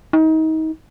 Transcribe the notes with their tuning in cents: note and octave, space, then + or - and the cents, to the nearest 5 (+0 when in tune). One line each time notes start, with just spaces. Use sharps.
D#4 +30